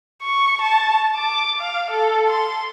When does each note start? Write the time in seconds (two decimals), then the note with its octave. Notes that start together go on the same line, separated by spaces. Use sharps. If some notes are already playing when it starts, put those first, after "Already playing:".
0.22 C#6
0.61 A5
1.16 D6
1.60 F5
1.91 A4
2.28 C6